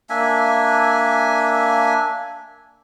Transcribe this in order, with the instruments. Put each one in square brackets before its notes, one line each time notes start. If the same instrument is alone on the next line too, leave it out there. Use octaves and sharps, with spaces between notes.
[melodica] A#3 D4 E5 G#5